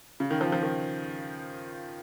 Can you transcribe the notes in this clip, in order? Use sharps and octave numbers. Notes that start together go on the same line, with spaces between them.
C#3
D#3
F3
F3
D#3